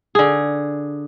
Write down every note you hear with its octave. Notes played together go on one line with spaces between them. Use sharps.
D3 G#4